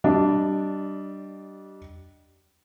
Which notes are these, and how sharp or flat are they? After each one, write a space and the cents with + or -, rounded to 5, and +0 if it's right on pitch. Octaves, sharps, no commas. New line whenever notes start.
G3 -25 D4 +0 D#5 +0